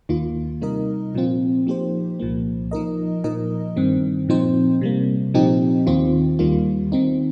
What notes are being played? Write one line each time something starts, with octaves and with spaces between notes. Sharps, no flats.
D#2 D#3 A#3 F4
C3 G3 D#4 A#4 D#5
A#2 F3 C4 F4
F3 A#3 D#4 G4 C5
C2 A#2 F3 A#3
F3 D#4 A#4 D#5
A#2 F3 D#4 A#4 D#5
G2 D#3 C4
A#2 F3 C4 D#4 C5
C3 G3 A#3
A#2 F3 C4 D#4 G4
D#2 D#3 C4 F4
D#2 D#3 G3 A#3 F4
D#3 C4 D#4